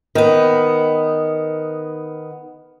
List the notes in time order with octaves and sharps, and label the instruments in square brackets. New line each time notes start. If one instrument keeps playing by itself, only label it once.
[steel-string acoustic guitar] D#3 B3